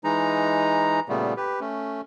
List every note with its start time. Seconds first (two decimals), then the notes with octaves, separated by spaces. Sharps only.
0.04 E3 G#3 D#4 A#5
1.09 A#2 C#3 G3 A3 B3
1.37 G4 B4
1.60 A3 C#4